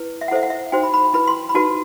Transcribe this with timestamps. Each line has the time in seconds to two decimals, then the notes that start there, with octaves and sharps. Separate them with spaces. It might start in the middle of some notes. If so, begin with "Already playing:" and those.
Already playing: E4 B4
0.21 E5
0.28 F#5
0.31 E4 A4 C5 E5
0.43 F#5
0.50 E5
0.72 D#4 F#4 C5 G5
0.83 B5
0.94 B5
1.14 E4 B4 B5
1.27 C6
1.49 B5
1.54 D#4 F#4 B4 A5